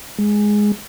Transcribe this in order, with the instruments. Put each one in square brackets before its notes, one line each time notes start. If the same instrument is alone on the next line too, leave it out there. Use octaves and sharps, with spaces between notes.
[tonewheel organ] G#3